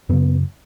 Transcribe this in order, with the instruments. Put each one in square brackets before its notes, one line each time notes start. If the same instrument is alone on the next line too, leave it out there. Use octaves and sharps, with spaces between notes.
[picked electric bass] F#2 C#3 B3